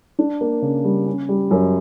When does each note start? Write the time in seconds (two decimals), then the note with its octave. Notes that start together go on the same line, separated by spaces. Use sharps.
0.19 D4
0.41 A#3
0.62 C#3
0.84 G3
1.07 C#4
1.29 G3
1.51 F#2